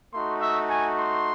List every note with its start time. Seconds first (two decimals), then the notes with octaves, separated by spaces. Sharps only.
0.14 A3 D#4 F#4 C6
0.41 E5
0.70 G#5
0.98 C6